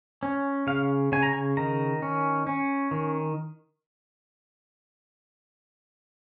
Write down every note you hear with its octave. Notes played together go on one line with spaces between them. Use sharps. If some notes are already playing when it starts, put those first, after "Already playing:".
C#4
C#3 F5
C#3 G#5
A#5
G#5
D#3 A#5
C#4
C#4
D#3